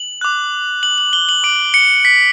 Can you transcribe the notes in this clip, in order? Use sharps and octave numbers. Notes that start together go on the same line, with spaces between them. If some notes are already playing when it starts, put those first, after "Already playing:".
Already playing: F#7
D6 F#6
F#7
F#7
G7
F#7
D6 F#6 D7
C#7
B6